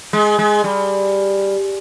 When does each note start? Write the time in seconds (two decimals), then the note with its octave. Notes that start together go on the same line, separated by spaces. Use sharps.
0.13 G#3
0.39 G#3
0.64 G3